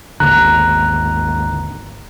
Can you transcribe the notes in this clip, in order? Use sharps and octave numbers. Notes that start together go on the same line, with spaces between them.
G#1 D#2 D3 A#5 F#6